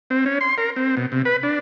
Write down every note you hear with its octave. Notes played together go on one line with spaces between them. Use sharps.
C4
C#4
C6
A#4
C4
B2
C3
B4
D4